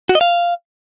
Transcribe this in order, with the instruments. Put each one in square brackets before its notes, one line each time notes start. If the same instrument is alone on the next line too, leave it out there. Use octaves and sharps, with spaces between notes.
[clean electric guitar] F#4
D#5
F5